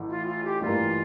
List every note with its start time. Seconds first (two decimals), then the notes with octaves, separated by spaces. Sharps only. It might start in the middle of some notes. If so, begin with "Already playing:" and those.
Already playing: A1 A2 E3
0.09 F4
0.27 F4
0.44 G4
0.61 A1 G2 E3 G3 A#3 F4